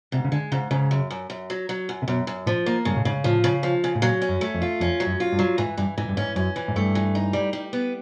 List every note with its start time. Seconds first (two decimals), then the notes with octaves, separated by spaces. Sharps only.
0.12 G#2 C3
0.25 C#3
0.32 D3 G#3
0.52 G#2 C#3
0.71 G#2 C#3
0.91 F#2
1.10 F#2
1.30 F#2
1.50 F#3
1.69 F#3
1.89 F#2
2.02 C3
2.08 F#2 B2
2.27 F#2
2.46 A2 F3
2.66 A#3
2.85 G2 C#3
2.96 A2
3.05 G#2 C#3
3.24 A2 F3
3.44 C#3
3.63 F3
3.84 C#3
3.95 A2
4.02 A#2 F#3
4.22 C#4
4.29 F#2
4.41 A3
4.54 F2
4.62 F4
4.80 F2 C#4
5.00 F#3
5.06 F#2
5.20 F4
5.32 G2
5.39 F#3
5.58 G#2 E3
5.77 G2 E3
5.98 G#2 E3
6.09 G2
6.17 G#2 C#4
6.36 F#2 C#4
6.56 E3
6.68 G#2
6.75 G2 A3
6.95 E3
7.15 D#4
7.33 G3
7.53 G3
7.73 B3